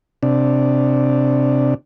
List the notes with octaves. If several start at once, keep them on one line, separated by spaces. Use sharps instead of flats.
C3 D4